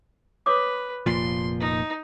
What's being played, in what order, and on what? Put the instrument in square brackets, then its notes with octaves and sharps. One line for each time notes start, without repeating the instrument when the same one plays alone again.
[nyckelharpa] B4 [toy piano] C#5 D6 D#6
[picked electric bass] F1 A#2 F3 [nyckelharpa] C6
[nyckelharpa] D#4